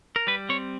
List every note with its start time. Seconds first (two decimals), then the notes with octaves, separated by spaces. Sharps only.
0.16 A#4
0.27 G3 B4
0.49 C4 C#5